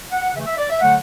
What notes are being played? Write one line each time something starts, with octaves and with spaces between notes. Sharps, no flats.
F#5
C#3 E3 A3 E5
E5
D5
E5
D3 F#3 A3 F#5